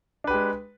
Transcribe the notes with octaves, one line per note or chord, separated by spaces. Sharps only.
G#3 D4 G4 B4